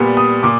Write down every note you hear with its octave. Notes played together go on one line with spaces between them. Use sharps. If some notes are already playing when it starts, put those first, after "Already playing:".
Already playing: A#2 G3 B3
D#6
A#2 D6